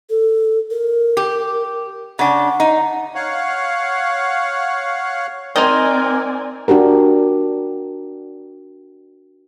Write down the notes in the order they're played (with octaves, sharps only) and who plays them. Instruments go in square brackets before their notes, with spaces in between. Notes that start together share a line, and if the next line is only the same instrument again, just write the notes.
[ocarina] A4
A#4
[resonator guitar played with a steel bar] G4
[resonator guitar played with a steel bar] C#3 D4 [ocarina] F#5
[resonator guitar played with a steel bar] D#4
[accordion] C#5 F5 F#5
[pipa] D#3 [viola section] C4 D5 G#5 [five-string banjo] D#4 C5 D#5 [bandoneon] A#4
[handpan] D4 F#4 G4 A#4